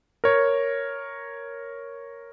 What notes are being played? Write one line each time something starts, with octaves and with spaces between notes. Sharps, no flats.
A#4 C#5